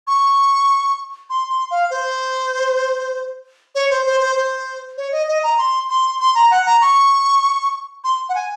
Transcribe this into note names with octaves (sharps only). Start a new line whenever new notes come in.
C#6
C6
C6
F5
C5
C#5
C5
C5
C5
C5
C#5
D#5
D#5
A#5
C6
C6
C6
A#5
F#5
A#5
C#6
C6
F#5
G#5